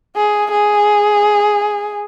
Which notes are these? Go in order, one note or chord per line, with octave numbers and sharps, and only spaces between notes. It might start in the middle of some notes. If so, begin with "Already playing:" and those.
G#4
G#4